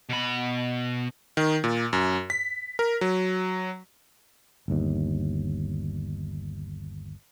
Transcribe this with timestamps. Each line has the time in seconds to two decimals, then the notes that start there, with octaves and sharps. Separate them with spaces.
0.09 B2 B5
1.37 D#3
1.64 A#2
1.93 F#2
2.30 B6
2.79 A#4
3.01 F#3
4.68 G1 D#2